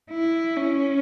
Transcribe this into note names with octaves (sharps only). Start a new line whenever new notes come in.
E4
C#4